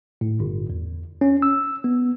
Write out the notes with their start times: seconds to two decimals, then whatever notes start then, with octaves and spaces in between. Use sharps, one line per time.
0.21 A2
0.40 G1
0.70 E2
1.21 C#4
1.42 E6
1.84 B3